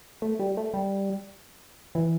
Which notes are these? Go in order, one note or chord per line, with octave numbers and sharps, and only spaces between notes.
A3
G3
A3
G3
E3